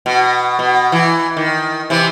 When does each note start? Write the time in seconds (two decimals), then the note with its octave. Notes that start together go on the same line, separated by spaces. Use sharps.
0.06 B2
0.59 B2
0.92 E3
1.37 D#3
1.90 C3 E3